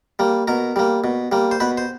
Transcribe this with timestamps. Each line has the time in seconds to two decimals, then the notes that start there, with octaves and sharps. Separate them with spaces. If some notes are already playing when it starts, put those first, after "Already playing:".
0.19 G3 A#3
0.48 B2 A#4
0.76 G3 A#3
1.04 B2
1.32 G3 A#3
1.51 C5
1.60 B2 B4
1.77 C5